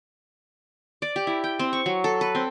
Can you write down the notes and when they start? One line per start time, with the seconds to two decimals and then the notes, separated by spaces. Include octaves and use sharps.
1.02 D5
1.16 G4
1.27 E4
1.44 G5
1.59 C4
1.73 C#6
1.86 F#3
2.04 A4
2.21 B4
2.35 C4